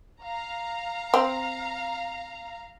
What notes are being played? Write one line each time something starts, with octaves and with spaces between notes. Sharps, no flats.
F5 A#5
C4